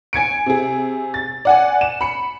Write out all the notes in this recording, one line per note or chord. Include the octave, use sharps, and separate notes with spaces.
G#5 G#6 C#7 D7
C3 G#4
A6
D5 F#5 G#5
E7
B5 C#7